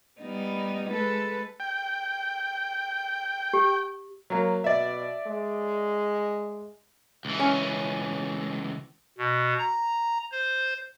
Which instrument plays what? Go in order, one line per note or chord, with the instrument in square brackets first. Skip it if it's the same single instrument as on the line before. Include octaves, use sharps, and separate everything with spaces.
[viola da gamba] G3 B3 D#4
G#3 A4 B4
[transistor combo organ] G5
[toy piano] G4
[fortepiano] F#3 A#3
[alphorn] B2 [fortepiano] D5 E5
[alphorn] G#3
[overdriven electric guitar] C#2 E3
[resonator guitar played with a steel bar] C#4
[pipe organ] B2
A#5
C5